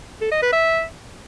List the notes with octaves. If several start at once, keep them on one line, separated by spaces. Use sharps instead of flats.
A4
D#5
B4
E5